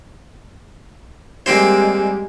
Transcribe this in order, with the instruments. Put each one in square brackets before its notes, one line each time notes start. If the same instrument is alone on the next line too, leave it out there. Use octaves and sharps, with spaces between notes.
[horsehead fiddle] G3 G#3 [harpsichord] A#3 C4 C5